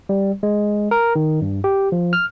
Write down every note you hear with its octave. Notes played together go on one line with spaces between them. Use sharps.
G3
G#3
A#4
D#3
G2
G4
F3
F6